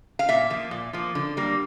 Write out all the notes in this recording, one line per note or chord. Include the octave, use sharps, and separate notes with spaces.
F5
A#2 E5
F3 A#3
A#2
F3 A#3
D3
G3 A#3